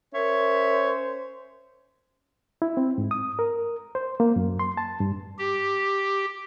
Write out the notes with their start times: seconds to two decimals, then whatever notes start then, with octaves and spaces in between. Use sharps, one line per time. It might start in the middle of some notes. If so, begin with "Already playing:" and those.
0.14 C#4 A#4 C5 C#5 E5
2.62 E4
2.77 C4
2.98 G#2
3.11 D#6
3.39 A#4
3.95 C5
4.20 A#3
4.36 F#2
4.59 C6
4.77 A5
5.00 G2
5.38 G4